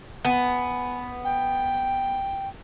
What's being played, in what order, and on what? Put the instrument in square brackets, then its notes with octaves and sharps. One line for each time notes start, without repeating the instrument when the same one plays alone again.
[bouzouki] B3 [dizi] G#5
[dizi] G5